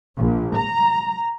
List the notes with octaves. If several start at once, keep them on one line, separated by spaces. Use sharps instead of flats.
A#1
A#5